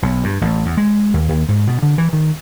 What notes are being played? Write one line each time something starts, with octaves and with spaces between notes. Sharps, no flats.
B1
G2
A1
E2
G#3
D#2
D#2
G#2
B2
D3
E3
D#3